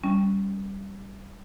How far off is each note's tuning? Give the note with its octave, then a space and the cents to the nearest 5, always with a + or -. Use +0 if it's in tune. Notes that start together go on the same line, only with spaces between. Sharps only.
G3 +0 C#4 +0